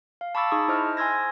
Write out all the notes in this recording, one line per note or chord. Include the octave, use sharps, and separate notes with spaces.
F5
A5 B5 C#6 D6 E6 A6
D#4 G#4 A5 C#6 D#6
E4 C5 D#5 E5 F6
G#5 C6 E6 G#6 A#6